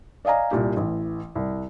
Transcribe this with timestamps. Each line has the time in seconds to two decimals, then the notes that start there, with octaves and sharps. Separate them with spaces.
0.25 D5 D#5 F5 G#5 A#5
0.51 C2 A#2 G4
0.77 A1 E3
1.35 C2